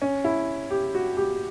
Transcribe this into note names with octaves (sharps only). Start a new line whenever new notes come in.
C#4
E4
G4
F#4
G4